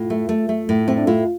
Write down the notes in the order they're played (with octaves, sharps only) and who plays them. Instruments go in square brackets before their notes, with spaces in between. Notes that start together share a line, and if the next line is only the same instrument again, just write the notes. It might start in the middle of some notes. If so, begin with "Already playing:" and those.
Already playing: [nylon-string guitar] A2 [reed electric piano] F4
[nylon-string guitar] A3
A3
A3
A2
[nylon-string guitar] A3 [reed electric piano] C4
[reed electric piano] D4
[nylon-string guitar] A2 [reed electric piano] F4